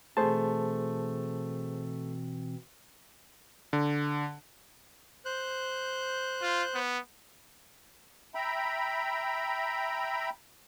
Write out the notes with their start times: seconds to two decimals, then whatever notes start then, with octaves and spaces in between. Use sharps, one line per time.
0.17 B2 E3 A3 C4 G#4 C5 A5
3.73 D3
5.25 C5 F#6 G6
6.42 F4
6.75 B3
8.35 E5 G5 A#5 B5